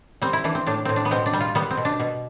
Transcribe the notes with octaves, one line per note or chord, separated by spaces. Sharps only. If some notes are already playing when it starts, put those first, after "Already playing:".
G3 C4
E4
E3 D4
C4
A2 D4
A2 C4
D4
B3
B2 C4
D4
G3
F4
G3 B3
C4
B2
D4
B2